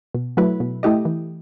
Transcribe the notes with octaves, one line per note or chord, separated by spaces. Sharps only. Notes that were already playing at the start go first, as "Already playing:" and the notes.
B2
F#3 A3 E4 B4
B2
A3 E4 G4 D#5
E3